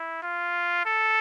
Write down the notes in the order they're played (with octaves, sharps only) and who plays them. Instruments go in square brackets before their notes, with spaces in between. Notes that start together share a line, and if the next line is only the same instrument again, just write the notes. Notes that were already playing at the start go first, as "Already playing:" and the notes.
Already playing: [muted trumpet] E4
F4
A4